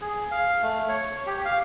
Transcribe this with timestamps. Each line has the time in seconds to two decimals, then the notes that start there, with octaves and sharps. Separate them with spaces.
0.01 G#4
0.31 F5
0.62 A3
0.89 C#5
1.26 G4
1.45 F5